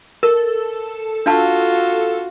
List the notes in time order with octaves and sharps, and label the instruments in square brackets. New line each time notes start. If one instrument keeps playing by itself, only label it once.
[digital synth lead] A4 [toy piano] A#4
[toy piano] D4 F5 A5 [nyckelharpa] F4 F#4